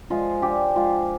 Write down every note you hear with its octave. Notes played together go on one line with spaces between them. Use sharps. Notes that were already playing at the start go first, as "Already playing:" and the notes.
F3 G#3 F4
D3 G4
F3 G#3 F4